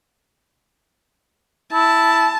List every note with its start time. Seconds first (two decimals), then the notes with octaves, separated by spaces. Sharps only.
1.73 E4 A5